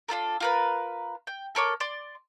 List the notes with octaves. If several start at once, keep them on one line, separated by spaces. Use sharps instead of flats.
D4 F4 A4 A#4
F4 A#4 B4
G5
A4 A#4 C#5 D6
D5 C6